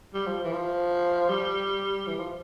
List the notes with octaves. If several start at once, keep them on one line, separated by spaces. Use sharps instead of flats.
G3
F3
E3
F3
G3
E3
F3